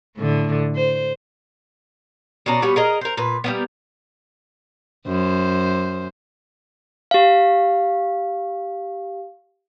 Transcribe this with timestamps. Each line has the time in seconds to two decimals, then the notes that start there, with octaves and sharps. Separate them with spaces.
0.18 A2 D3
0.75 C5
2.46 B2 C#4 D4 A#5
2.62 G3 B3 C#4 F#4
2.76 G#4 A#4 D#5
3.01 A#4 C5
3.17 A#2 B4
3.44 G3 A#3 B3
5.07 F#2 C5
7.11 G4 F5